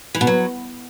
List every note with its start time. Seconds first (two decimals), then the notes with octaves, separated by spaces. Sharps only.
0.15 E3
0.21 B2
0.27 F#3